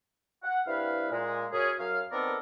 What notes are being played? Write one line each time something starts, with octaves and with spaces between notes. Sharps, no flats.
F#5
G2 C4 E4 B4 F5
A#2 G#3
F#2 C#4 G#4
F#2 F5
D#3 B3 C4 A4 A#4 D5